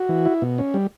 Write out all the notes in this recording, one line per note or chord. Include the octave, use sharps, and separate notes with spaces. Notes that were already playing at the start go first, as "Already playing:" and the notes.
Already playing: F#4
E3
E4
B2
C#4
G3